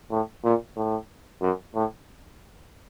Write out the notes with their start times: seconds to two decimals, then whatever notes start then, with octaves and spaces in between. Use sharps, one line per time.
0.11 A2
0.44 A#2
0.76 A2
1.41 F#2
1.74 A2